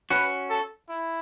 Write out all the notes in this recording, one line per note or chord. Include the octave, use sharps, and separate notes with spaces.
C#4 F#4 B4
A4
E4